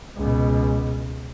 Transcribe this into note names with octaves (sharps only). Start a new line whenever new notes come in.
C#2 B2